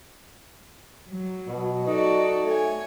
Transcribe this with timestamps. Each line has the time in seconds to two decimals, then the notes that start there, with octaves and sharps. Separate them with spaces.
1.09 F#3
1.48 B2
1.87 D#4 F#4 A4 D5
2.45 A3 C#5 G#5